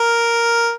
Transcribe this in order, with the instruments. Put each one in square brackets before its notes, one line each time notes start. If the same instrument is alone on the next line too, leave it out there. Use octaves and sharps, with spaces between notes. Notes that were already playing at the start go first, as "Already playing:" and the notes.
Already playing: [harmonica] A#4